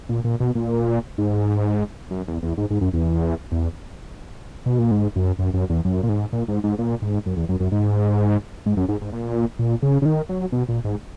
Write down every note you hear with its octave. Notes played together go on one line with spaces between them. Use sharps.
A#2
A#2
B2
A#2
G#2
F#2
E2
E2
G#2
G#2
F#2
E2
E2
B2
A#2
G#2
F#2
F#2
F#2
E2
F#2
A#2
G#2
A#2
G#2
G#2
A#2
G#2
F#2
E2
F#2
F#2
G#2
G#2
F#2
G#2
G#2
A#2
A#2
C#3
C#3
D#3
F#3
B2
A#2
G#2